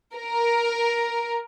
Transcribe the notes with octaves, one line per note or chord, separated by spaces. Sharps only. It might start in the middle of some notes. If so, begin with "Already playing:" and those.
A#4